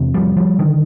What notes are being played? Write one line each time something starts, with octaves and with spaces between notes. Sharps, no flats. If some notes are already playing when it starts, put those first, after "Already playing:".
Already playing: E2 C3
F3 G3
F3 G3
D3 D#3